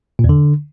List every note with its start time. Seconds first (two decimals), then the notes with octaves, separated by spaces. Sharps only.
0.19 A#2
0.24 E2
0.29 D3